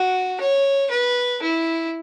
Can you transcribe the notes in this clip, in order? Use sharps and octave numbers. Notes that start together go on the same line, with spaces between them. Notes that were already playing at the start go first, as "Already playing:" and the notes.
Already playing: F#4
C#5
B4
E4